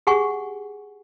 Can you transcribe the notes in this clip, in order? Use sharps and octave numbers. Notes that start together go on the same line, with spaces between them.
G4 G#4 F#5 G#5 C#6